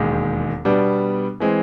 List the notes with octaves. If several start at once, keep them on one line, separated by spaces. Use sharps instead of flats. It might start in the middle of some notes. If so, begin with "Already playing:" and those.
Already playing: E1 D#2 D#3 G#3
B2 G3 B3 D4
E3 G#3 C4